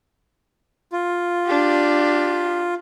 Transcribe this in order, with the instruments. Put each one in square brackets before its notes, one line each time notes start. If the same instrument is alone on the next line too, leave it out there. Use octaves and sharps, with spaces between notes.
[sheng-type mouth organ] F4
[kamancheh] D4 G4